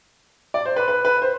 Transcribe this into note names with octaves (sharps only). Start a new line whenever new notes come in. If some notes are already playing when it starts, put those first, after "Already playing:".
D5
C5
B4
B4
B4
C5